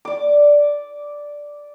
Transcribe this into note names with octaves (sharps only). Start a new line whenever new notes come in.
D5 D6